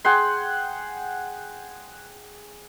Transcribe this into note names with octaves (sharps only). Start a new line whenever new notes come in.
G#4 F#5 G5 C6